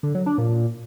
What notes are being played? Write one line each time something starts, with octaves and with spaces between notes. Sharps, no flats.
D3
F#3
D4
A#2